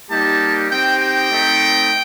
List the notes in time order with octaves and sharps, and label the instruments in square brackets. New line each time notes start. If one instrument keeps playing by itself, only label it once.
[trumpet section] G3 A#3 D#4 G4 A5
C4 D#4 G4 G5
G5
A3 C4 D#4